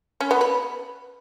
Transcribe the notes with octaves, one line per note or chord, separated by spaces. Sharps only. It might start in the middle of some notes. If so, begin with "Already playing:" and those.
C#4
B3
B4